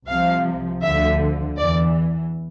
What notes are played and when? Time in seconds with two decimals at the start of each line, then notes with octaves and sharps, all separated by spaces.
0.09 C2 C3 F3 F5
0.83 D2 D3 F3 E5
1.57 E2 E3 D5